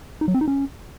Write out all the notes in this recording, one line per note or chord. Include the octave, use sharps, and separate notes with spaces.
D#4
F#3
C4
D#4
C#4